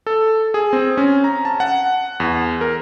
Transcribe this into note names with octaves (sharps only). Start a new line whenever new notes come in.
A4
G#4
C4
C#4
A#5
A5
F#5
E2
A#4